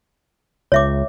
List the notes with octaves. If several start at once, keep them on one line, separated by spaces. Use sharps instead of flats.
C#2 C#5 E5 D6